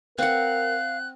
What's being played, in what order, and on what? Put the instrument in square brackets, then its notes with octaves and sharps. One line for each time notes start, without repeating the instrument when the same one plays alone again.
[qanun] C4 F#5 [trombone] A#4 [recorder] F5 [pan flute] F#6